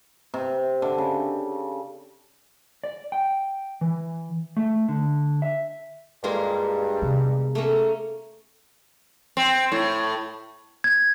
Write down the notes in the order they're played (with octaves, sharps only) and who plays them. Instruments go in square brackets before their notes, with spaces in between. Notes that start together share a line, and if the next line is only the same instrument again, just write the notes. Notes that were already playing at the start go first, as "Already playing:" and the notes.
[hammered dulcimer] C3
D3
C#3
[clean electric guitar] D5
G5
E3
A3
D3
E5
[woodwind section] G2 [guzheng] G#3 A#3 F4
[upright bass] C3 B3
[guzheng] A3 A#3 C#4
[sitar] C4
A2
[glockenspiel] G#6